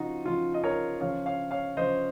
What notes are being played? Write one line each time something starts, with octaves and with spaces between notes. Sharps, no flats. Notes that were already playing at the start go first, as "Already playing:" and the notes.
Already playing: C#3 F3 D#4 F4 F#4
C#3 F3 F4
D#5
A#4 C#5
C#3 F3 C#5 F5
C#5 F5
C#5 F5
C#3 F3 C5 D#5